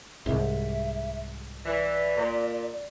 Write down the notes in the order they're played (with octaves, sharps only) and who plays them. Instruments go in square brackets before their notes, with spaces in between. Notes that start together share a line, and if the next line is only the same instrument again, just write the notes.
[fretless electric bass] C2 G#2 [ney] E5
[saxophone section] E3 [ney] D5
[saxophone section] A#2